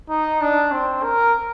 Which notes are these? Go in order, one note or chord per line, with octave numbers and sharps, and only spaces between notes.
D#4
D4
C4
A#4